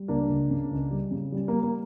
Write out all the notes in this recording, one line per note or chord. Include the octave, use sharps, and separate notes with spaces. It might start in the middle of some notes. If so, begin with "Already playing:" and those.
Already playing: G3
C#2 A#3 D4
C#2
C#3
C#2
G3
C#3
G3
G3 A#3
A#3